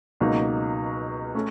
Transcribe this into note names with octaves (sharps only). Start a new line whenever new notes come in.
C#2 B2 F#3 A#3 D#4
A3 C#4